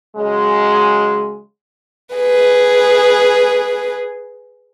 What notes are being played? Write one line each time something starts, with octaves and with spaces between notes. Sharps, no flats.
C#3 F#3 G#3
G#4 B4